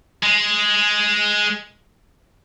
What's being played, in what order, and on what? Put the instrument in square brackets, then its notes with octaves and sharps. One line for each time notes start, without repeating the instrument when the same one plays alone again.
[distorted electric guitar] G#3